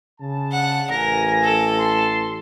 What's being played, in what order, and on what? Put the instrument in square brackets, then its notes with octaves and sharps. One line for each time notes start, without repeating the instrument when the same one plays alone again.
[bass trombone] C#3 [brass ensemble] A5
[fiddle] F#5
[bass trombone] A1 [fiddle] A#4 [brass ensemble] G#5 [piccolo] A#6
[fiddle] A4
[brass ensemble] A5 [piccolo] C6